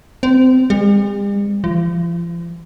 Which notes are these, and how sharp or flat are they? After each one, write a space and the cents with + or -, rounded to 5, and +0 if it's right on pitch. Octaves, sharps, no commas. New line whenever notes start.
C4 -25
G3 +45
F3 -40